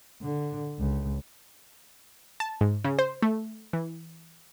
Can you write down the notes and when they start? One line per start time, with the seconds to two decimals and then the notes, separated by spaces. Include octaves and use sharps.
0.22 D3
0.79 C#2
2.40 A5
2.61 G#2
2.85 C#3
2.99 C5
3.23 A3
3.73 E3